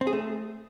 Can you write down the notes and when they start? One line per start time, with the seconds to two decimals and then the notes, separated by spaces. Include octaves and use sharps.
0.01 C4
0.07 G#4
0.13 A3